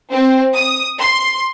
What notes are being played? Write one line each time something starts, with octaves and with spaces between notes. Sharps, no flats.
C4
D#6
C6